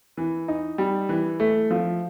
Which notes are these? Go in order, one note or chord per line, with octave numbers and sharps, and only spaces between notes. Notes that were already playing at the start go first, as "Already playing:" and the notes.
E3
D#4
G3
E3
A3
F3